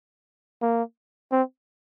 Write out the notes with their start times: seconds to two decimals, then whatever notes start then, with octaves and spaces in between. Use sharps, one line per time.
0.62 A#3
1.32 C4